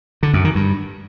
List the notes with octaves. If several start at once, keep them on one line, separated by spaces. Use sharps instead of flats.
D3
F#2
D#3
G2